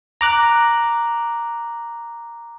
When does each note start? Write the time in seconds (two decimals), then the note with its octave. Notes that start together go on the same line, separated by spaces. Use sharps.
0.21 A#5 D6 F#6